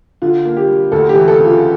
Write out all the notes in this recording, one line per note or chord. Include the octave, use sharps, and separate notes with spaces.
D3 F4
A#3
G4
G3
D2 A4
G4
E3
A4
C#3
F4